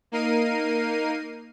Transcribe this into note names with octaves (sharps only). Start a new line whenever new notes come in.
A#3 D#4 A#4 C7 D#7